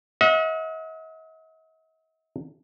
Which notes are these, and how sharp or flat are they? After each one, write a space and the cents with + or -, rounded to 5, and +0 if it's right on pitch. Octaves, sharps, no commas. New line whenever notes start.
D#5 +45 F#5 -30